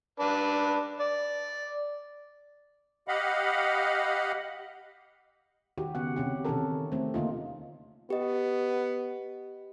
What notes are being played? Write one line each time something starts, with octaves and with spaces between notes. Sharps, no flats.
D4 B4
D5
G4 D#5 F5 F#5 B5
D#3 F#4 G4
C#3 B3 F#5
C3 C#4 G4
C3 D#3 E3 C#4 A4 A#4
A3 C4
D3 A#3 D#4 F4
B3 G4 D#5